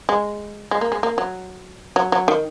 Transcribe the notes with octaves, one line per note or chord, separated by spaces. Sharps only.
G#3
G#3
A#3
G#3
A#3
F#3
F#3
F#3
D#3